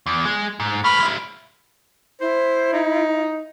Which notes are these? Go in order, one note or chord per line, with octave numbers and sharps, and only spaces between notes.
E2
G#3
G#2
A3 B4 B5 F6
G#3 E4
E4 C5
D#4